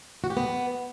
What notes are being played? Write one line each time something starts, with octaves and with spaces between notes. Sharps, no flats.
F#4
G4
B3